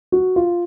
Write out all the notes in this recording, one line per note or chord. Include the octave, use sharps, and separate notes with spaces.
F#4
F4